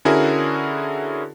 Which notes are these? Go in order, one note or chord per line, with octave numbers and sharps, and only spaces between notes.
D3 C#4 E4 F#4 G#4 A#4